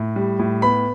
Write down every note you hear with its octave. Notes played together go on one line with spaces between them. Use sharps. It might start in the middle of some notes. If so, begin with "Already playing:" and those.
Already playing: A2
G3
A2
B3 B5